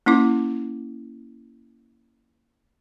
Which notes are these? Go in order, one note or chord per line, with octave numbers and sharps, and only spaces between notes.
A#3 C#4 E4 D6